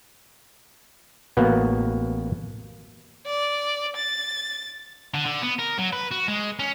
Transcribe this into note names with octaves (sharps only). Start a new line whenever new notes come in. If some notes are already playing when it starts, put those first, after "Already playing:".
A1 A#3 B3 F#4 B4
D5
A6
D3
D3
B3
A#4
F#3
B4
F#4
G#3
C#4